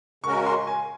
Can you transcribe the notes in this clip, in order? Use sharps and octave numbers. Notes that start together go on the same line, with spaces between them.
C#3 G#3 C#4 F#4 A#4 C#6
C6
G#5